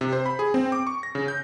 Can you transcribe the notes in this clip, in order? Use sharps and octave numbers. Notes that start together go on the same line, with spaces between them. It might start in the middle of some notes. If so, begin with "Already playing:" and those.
C3
C5
B5
G#4
C4
D6
C#6
A#6
C#3
G6